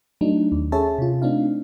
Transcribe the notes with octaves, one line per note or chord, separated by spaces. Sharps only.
F#3 A3 D4 D#4
D#2
C#4 G#4 A4 C#5 E5 A5
C3 F4
A3 C4 D4 D#4 F5